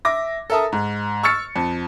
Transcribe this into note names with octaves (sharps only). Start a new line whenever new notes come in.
E5 D6 A#6
A4 A#4 E5 A5 D#6
G#2
C#6 E6 F6 A6 C#7
F2